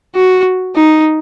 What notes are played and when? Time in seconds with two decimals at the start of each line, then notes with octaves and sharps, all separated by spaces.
0.16 F#4
0.76 D#4